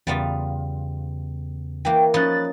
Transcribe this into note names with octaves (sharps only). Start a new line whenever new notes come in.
E2 C#3 G3 B3 F4
E3 A#3 G5
F3 C#4 D#4 B5 F#6 A6